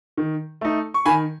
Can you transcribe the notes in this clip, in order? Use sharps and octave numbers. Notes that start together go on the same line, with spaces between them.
D#3
A3 D#4
C#6
D#3 G#5 B5